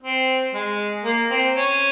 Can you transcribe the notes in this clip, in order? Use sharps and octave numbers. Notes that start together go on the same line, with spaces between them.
C4
G#3
A#3
C4
C#4